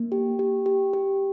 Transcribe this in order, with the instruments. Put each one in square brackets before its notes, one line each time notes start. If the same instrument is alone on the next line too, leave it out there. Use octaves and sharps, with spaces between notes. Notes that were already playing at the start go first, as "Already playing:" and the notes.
Already playing: [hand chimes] A#3
G4
G4
G4
G4